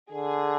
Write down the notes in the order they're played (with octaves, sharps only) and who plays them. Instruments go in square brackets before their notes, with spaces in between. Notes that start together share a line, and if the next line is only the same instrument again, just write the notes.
[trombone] D3 [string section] G#4